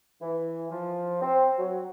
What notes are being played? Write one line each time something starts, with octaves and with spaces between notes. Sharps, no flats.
E3
F3
C4
F#3